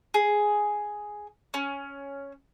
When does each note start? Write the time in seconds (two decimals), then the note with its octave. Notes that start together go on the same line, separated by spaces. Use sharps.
0.14 G#4
1.54 C#4